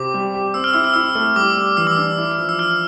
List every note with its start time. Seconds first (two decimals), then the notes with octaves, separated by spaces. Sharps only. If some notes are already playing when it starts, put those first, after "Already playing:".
Already playing: C3 C4 G4 D6
0.14 G3
0.34 G4
0.54 C4 E6
0.64 F6
0.74 E4 E6
0.84 F6
0.94 E4 E6
1.15 A3
1.36 G3 D6
1.57 G3
1.77 E3 E6
1.87 D6
1.97 D4 E6
2.18 E4
2.38 F3
2.49 E6
2.59 E4 F6